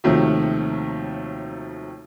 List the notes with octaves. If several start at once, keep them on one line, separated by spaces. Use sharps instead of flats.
D#2 C3 D#3 F3 F#3 A3